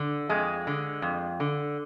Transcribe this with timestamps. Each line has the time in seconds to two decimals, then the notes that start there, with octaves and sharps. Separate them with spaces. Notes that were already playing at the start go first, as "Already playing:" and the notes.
Already playing: D3
0.29 F2 G#3
0.67 D3
1.02 F2
1.40 D3